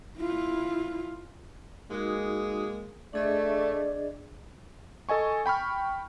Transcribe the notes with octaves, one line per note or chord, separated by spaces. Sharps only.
E4 F4
G#3 A#3 D#4 F#4 D#6
A3 D4 G#4 D5 D#5
A4 D#5 G#5 C#6
G5 B5 C#6 F6